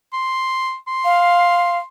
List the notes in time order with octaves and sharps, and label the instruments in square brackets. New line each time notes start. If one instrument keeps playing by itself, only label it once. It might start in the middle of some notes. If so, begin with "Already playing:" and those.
[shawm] C6
C6
[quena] F5